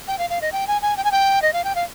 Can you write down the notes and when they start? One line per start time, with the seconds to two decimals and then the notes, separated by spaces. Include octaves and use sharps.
0.08 G5
0.19 F5
0.30 F5
0.41 D#5
0.52 G5
0.67 G#5
0.82 G#5
0.97 G5
1.04 G#5
1.12 G5
1.42 D#5
1.53 F5
1.64 G5
1.75 F5